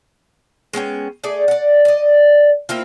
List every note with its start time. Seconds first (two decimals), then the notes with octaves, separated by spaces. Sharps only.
0.73 G#3 B3 C#4 G5
1.24 A3 G#4 D5
1.48 D5 F#5
1.85 D5 D#5
2.69 A#3 C4 E4 F4